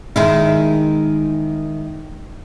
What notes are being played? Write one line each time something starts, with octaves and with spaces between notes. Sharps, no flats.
D#3 G#3 E4